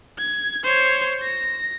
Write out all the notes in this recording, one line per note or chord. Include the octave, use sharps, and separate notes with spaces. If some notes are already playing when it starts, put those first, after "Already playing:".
G#6
C5 C#5
A#6